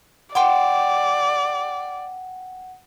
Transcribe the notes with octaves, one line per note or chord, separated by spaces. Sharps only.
D5 F#5 G5 C6 D6